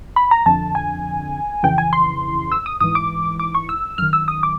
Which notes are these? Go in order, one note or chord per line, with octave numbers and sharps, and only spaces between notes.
B5
A#5
F2 D3 A5
G#5
F2 C#3 E3 G5
G#5
C6
E6
D#6
G#2 E3 D#6
D6
D6
C#6
E6
F#2 D#3 F6
E6
D#6
D6